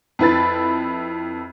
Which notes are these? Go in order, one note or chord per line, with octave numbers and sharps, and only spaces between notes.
F2 E4 B4 A6